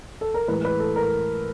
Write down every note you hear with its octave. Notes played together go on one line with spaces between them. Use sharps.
A4
A#4
A2 E3 G#3 B4
B4
A4
A#4